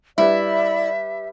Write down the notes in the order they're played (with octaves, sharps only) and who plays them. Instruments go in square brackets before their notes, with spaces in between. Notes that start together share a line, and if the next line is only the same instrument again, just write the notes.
[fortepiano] G3 B4 [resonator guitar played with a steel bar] E4 [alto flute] D5 [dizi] E5